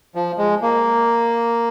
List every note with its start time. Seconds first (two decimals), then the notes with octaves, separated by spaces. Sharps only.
0.15 F3
0.38 G#3
0.62 A#3